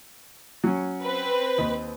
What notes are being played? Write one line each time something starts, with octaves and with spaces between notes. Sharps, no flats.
F#3 C#4
C4 B4
D#2 D#5